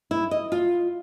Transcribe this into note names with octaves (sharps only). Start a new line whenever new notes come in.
E4
D#5
F4